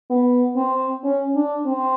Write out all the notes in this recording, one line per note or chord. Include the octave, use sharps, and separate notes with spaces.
B3
C4
C#4
D4
C4